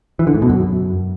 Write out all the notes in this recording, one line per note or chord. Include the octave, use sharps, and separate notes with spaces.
E3
D3
G#2
B2
F#2